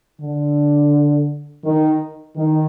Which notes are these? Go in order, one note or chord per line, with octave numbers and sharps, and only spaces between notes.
D3
D#3
D#3